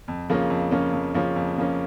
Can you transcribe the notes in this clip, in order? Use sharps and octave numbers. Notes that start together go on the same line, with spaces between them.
F2
C#3 F3 A#3 C#4
F2
C#3 F3 A#3 C#4
F2
C#3 F3 A#3 C#4
F2
C#3 F3 A#3 C#4